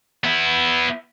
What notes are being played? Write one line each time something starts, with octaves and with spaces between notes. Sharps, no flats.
B3 E4